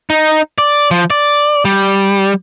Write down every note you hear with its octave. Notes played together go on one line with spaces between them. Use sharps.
D#4
D5
F3
D5
G3